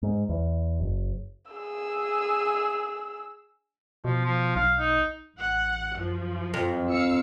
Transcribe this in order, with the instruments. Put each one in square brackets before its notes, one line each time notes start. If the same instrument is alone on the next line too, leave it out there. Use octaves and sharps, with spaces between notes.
[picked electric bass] G#2
E2
F#1
[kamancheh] G#4 E6
[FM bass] B2 [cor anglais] F3
[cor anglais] F3
[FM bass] B1 [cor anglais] F5
[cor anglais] D#4
[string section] A1 F#5
F#2 F3
[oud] F2
[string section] F5 E6 C#7